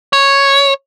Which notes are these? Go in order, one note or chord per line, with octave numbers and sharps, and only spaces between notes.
C#5